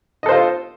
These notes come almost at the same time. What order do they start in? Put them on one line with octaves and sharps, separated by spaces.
D#5 A4 C5 F4